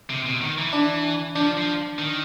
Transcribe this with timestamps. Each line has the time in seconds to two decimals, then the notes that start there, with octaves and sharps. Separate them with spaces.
0.10 C3
0.26 B2
0.42 D#3
0.58 E3
0.73 D4
1.36 F3 D4
1.57 F3
1.99 D#3